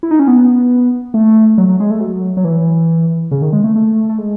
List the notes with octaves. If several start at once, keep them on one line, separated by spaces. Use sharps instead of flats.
E4
D#4
C#4
B3
A3
F#3
F#3
G#3
A3
F#3
F#3
E3
C#3
D#3
G#3
A3
A3
A3
G#3